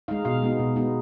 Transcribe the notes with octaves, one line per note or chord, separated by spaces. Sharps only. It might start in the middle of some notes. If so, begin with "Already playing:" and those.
G#3 D#4 F5
B2 F5
G#3 B3 D#4
B2
G#3 B3 D#4